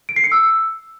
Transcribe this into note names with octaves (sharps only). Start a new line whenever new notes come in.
D7
C7
C#7
E6